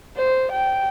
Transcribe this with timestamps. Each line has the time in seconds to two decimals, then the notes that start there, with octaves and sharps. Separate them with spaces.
0.17 C5
0.52 G5